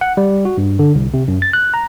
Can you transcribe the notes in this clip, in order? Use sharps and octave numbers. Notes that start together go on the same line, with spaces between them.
F#5
G3
F#4
G2
D3
C2
C3
F#2
A6
F#6
A#5